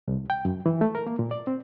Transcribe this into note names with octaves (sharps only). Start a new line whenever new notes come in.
C2
G5
F#2
E3
A3
A#4
A#3
A#2
D5
C4